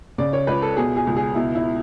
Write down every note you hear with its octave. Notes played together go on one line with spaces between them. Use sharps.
C#3 D5
C#5
C#2 B4
A4
B2 G#4
G#4
C#2
G#4
B2 E4
E4